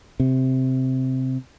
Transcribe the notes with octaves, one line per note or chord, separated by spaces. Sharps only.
C3